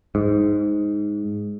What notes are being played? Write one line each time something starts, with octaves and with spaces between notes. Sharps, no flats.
G#2